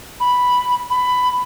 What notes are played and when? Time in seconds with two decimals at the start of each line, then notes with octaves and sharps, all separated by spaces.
0.20 B5
0.90 B5